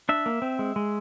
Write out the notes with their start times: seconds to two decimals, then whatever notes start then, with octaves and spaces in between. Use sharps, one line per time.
0.09 D4 E5
0.26 A#3
0.42 C4
0.59 G#3
0.76 G#3